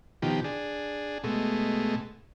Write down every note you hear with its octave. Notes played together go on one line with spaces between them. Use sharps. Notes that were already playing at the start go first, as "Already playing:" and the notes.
B2 D#3 F3 G4
D4 G#4
B2 G#3 A3